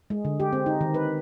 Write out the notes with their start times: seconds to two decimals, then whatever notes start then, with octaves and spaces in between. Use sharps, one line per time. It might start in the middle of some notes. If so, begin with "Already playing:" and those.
0.10 G#3
0.25 D3
0.40 G4
0.53 C4
0.66 D#4
0.81 D#3
0.94 B4